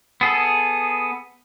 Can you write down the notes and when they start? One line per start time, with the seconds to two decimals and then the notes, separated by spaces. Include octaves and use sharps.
0.21 B3 G#4 A4